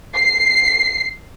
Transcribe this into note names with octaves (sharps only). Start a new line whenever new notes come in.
C7